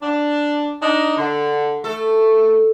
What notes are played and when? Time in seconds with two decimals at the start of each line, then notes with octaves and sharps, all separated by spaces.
0.01 D4
0.80 D4 D#4
1.17 D3
1.84 A3 A4